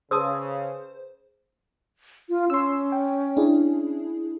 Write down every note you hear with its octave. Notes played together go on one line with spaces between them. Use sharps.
C#3 G#4 B4 C5 A5 D#6 E6
F4
C#4 C6 E6
G5
D4 E4 G#4